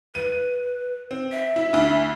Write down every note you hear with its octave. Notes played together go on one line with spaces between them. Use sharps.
B4 D#7
C4
E5
E4
D2 D3